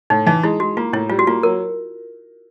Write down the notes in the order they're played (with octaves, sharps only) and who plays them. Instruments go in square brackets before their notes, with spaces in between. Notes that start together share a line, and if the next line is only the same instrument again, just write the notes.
[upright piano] A2 [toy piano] D#4
[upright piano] E3 [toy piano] D#4
[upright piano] G#3 [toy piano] E4
[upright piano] G#3 [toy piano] F#4
[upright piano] A#3 [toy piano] F4
[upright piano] A2 [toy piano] E4
[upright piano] G3 [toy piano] F4
[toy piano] F#4
[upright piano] A#3 [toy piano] F4
[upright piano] F#3 [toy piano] A#4